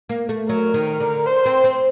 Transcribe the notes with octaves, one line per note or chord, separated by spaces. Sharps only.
A#3
A3
F#3 A#4
D#3
A#4
D3
C5
C4
C4